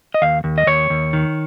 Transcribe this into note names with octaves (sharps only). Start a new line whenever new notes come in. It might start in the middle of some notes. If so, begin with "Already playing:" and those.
D#5
D#2 F5
D#2
D#5
D#2 C#5
D#2
D#3